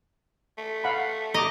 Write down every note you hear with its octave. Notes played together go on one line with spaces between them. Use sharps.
A3
F5 F#5 B5
D#5 A#5 D6